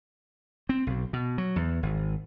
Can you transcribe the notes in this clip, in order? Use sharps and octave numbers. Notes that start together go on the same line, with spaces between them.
C4
B1
B2
F#3
E2
G#1